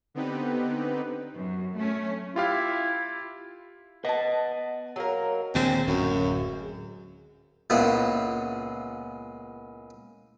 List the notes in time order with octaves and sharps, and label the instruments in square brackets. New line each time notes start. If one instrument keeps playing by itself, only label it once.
[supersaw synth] D3 B3 C4 D#4 G4 B4
[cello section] F#2
A3 C#4
[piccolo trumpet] E4 [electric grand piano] F4 G4 F5
[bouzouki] B3 A5 [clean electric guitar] D#5 F#5
[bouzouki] F#3 A#3 A#4
[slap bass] D#2 A#2 D3 [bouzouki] G#3 [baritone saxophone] C4
[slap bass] D1 [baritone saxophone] F#2
[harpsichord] C#2 A#2 C#3 G#3 B3 E4